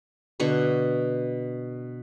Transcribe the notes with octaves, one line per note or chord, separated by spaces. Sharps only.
B2 D3 F#5 C#6